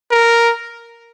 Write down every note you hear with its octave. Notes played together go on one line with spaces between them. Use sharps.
A#4